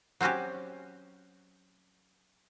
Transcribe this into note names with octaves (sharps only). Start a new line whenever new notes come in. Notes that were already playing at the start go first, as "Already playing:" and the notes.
F#3 C4 C#4 F#4 G4